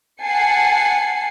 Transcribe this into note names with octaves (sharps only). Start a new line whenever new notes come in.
F#5 G#5 A5 C7 C#7